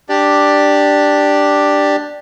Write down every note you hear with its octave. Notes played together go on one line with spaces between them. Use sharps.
D4 G4 D5